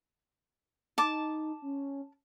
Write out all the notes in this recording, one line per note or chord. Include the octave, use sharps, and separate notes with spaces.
D#4 A5 D6
C#4